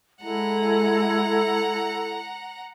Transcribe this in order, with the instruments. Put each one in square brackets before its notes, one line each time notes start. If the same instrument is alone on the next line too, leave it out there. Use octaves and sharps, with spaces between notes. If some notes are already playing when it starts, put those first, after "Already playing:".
[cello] G#3 [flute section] E4 A4 [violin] F#5 A#5